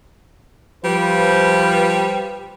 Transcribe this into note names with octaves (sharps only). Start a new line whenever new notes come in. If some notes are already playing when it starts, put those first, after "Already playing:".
F3 G3 B4